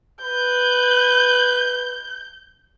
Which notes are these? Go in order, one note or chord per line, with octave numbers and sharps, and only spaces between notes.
B4 G6